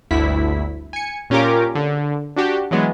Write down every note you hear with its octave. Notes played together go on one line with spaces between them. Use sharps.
G1 D2 E4 B6
G#5 C#7
A#2 C#4 F4 G4 A#4 D6
D3
D4 F#4 G4
E3 F#3 G#3 B3